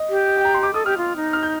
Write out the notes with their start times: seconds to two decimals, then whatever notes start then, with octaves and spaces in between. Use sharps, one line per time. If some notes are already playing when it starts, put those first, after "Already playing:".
Already playing: D#5
0.09 G4
0.28 D#5
0.37 G5
0.45 A#5
0.54 C6
0.63 D6
0.74 A4 D#6
0.86 G4 F6
0.97 F4
1.16 D#4
1.33 F6
1.43 G6